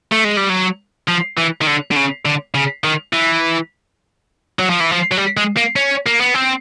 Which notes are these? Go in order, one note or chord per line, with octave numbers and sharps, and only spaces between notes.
A3
G#3
G3
F#3
F3
E3
D#3
D3
D3
C#3
D3
C#3
D#3
E3
F#3
F3
E3
F3
F#3
G3
G#3
A#3
C#4
A#3
B3
C4